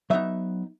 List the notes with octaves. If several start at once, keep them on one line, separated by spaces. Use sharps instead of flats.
F#3 B3 D#4 E5